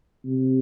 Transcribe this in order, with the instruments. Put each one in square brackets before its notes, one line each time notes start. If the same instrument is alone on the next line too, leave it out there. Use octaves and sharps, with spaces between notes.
[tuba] C3